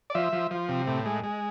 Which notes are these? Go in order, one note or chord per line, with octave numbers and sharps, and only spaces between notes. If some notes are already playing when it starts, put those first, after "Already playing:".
D5
F3 E5
F3
F3
C3
A2
G#3
G#3